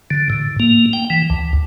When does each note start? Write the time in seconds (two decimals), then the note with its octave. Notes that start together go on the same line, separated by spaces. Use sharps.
0.10 D3
0.30 A2
0.60 A#3
0.93 G5
1.10 E3
1.30 D2